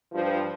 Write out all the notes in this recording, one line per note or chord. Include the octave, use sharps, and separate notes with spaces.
G2 F3